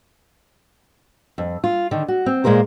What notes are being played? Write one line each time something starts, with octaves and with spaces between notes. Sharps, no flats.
F2
F4
D3 D#3
F#4
C4
A#2 G#3 A#3 A#4 C5